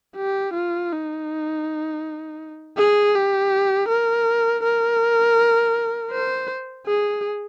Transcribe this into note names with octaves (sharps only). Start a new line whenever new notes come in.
G4
F4
D#4
G#4
G4
A#4
A#4
C5
G#4